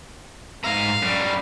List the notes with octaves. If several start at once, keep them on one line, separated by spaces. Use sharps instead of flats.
G#2 F5 A#5
F#2 G3